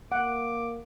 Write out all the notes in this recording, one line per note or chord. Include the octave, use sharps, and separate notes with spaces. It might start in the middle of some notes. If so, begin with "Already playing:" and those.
A#3 F#5 D6